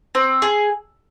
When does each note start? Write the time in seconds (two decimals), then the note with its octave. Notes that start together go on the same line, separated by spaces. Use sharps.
0.15 C4
0.42 G#4